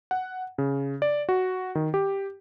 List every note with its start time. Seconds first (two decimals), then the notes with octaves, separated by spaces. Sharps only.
0.11 F#5
0.58 C#3
1.02 D5
1.29 F#4
1.75 D#3
1.94 G4